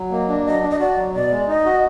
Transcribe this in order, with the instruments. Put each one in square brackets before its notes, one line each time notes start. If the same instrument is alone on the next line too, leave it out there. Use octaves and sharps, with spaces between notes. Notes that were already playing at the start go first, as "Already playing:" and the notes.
Already playing: [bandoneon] F#3
[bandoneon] A#3 [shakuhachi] D#5
[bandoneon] D4
[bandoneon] F#3 [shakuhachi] D#5
[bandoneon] D4
[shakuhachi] D#5
[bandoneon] F#4 [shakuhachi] D5
[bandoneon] F#3
[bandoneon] B2 [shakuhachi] D5
[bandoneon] G#3
[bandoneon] D#4 [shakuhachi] D#5
[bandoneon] F#4